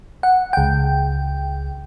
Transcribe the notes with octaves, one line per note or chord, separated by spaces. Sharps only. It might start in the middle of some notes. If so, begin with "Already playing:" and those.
F#5
C#2 G5